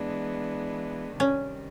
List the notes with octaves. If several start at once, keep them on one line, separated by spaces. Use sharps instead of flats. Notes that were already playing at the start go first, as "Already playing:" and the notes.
Already playing: E3 G#3 B3 D4
C3 D#3 G3 C#4